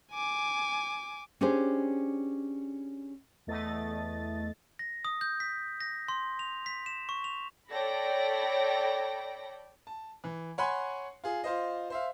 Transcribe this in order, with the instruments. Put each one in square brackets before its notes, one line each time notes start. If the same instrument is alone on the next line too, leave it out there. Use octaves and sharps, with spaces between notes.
[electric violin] G#5 D6
[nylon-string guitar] C#4 D4 G4 G#4 C5
[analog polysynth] E2 A3 D#5 A6
[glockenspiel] A#6
D#6
G6
B6
A#6
C6
F7
B6
E7
C#6
F7
[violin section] A4 C#5 D5 G5 B5 A#6
[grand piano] A5
E3
C#5 F#5 G#5 B5 C6
F4 G#4
F4 C5 D#5
C5 E5 F5